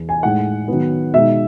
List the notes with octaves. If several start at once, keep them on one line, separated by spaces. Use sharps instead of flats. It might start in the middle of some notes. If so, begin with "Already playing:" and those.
Already playing: E2
G#5
A2 G#3 D#4 F#5
D#3 F#3 B3
B2 G#3 D#4 E5